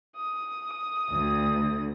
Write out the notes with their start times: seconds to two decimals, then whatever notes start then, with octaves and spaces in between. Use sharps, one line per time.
0.17 D#6
1.13 D2